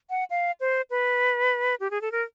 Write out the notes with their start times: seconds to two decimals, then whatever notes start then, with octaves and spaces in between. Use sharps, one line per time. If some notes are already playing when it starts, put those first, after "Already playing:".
0.10 F#5
0.30 F5
0.60 C5
0.90 B4
1.80 G4
1.91 G#4
2.01 A4
2.12 A#4